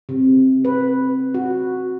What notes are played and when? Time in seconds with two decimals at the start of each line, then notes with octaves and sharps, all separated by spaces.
0.09 C3
0.65 B4
1.34 F#4